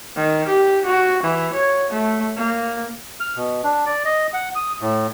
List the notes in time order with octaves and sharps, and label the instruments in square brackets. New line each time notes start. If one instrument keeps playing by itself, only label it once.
[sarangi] D#3
G4
F#4
E3
C#5
A3
A#3
[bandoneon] F6
B2
D4
D5
D#5
F#5
D#6
A2